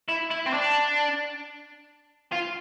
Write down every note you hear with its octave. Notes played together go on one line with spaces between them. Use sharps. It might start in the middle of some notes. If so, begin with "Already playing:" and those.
E4
E4
C4
D4
F4